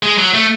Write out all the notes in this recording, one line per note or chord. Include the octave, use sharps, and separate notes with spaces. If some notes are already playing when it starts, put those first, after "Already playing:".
G#3
F#3
A3